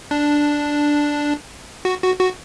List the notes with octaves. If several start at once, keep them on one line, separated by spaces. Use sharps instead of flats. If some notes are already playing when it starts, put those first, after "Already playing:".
D4
F#4
F#4
F#4